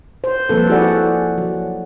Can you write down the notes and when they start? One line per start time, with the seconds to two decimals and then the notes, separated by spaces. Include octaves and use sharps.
0.24 C5
0.49 F3 G3 A#3 C4 A4 B4
0.69 E4 F#4 G#4 A4 D5 F#5
1.38 F#3